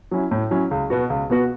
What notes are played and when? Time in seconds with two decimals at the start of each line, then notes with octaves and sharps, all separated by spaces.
0.11 F#3 C#4 E4
0.31 A2
0.51 F#3 C#4 E4
0.71 C#2
0.90 B2 B3 F#4
1.10 C#2
1.30 B2 B3 F#4